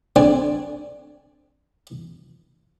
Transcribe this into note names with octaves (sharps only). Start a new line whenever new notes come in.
D3 C4 D5 G#5